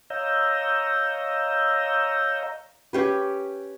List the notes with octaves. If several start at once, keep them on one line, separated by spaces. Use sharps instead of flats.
C#5 D#5 F5 A#5 E6 G6
C#4 G4 B4